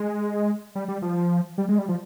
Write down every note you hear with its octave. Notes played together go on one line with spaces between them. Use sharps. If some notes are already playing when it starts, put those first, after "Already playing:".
Already playing: G#3
G3
G3
F3
G3
G#3
G3
F3